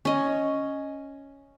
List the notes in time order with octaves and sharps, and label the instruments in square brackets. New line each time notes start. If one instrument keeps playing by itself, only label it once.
[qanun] C#4 D#5